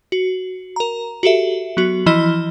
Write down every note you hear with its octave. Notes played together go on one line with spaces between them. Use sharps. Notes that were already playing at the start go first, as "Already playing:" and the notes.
F#4
A#4 A#5
F#4 G4 A4 E5
F#3 B3 F#4
E3 F3 E4 D#5 F6 G7